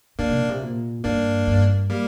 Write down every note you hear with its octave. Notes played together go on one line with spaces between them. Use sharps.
D3 A#3 D4
C3
A#2
C3
A#2
G2 A#3 D4
G2
G3 A#3